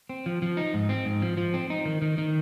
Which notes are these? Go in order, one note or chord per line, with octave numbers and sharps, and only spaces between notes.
C4
F3
F3
D#4
G#2
C4
G#2
F3
F3
C4
D#4
D#3
D#3
D#3